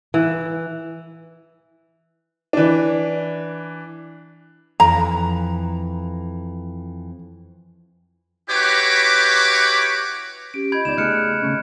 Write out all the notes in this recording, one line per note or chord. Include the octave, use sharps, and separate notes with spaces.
E3
E3 D4
F2 E3 A#5
E4 F#4 G4 B4 C#5 D6
C#4 G4 D7
F4 D#5 B5 G6 G#6
C#2 B3 D#4 D5 E7
C#3 A3 G#4 D#5 F6 F#6 C#7
C#3 A3 C#4